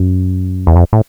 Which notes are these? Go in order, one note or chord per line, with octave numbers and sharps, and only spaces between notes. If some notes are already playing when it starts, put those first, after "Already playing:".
Already playing: F#2
E2
F2
A2